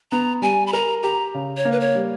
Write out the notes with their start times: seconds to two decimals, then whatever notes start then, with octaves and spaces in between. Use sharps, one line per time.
0.12 B3 A#5
0.42 G3 G#5
0.67 B5
0.73 A#4 A#5
1.03 G4 A#5
1.34 C#3
1.57 C#5
1.65 A#3
1.72 B4
1.80 C#5
1.95 G3